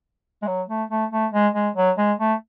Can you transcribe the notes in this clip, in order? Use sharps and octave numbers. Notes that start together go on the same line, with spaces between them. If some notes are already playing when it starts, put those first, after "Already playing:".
G#3
F#3
A3
A3
A3
G#3
G#3
F#3
G#3
A3